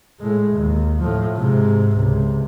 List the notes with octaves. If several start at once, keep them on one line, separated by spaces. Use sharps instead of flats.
A2 G#3
D#2
A2 F3
G#2 C3
C#2 C3